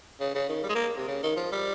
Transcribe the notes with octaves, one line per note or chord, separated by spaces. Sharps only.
C#3
C#3
D#3
G3
G#3
A#3
C3
C#3
D#3
F3
G3